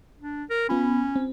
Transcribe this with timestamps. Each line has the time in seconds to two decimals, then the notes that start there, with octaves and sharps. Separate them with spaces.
0.19 D4
0.50 A#4
0.69 B3 C#4 F4 B5
1.16 C4